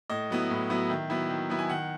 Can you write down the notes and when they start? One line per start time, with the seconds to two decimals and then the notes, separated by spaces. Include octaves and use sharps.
0.10 A2 D#5
0.30 F#3 B3 E4
0.50 A2
0.70 F#3 B3 E4
0.90 D#3 E5
1.10 F#3 B3 E4
1.30 D#3
1.50 F#3 B3 E4
1.59 G#5
1.69 D#3 F#5